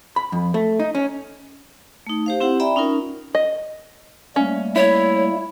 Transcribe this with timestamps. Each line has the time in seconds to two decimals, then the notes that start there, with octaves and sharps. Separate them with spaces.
0.16 B5
0.32 F2
0.54 A3
0.80 D#4
0.95 C#4
2.07 A3 D#4
2.26 G4 C5 F5
2.40 C4 E4 G4 F#5
2.60 D5 E5 G5 A#5 B5
2.76 C#4 D#4 F4 A#4
3.35 D#5
4.36 G3 A3 A#3 C#4
4.76 E4 C#5